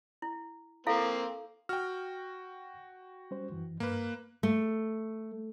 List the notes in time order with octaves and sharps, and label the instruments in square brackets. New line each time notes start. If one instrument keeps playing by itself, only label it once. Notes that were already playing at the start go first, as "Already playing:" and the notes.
[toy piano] E4
[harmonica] A#3 C4 [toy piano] E4 A4 F5
[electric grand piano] F#4 G5 [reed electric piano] F6
[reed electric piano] G3 C#4 C5
F#2 E3
[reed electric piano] G2 [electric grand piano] A#3 B4
[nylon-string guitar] A3